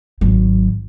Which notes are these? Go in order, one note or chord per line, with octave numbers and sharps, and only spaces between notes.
G#1 F#3